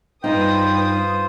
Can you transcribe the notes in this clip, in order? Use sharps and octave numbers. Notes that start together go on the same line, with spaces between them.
G2 D#4 F4 B4 C5 G5 D#6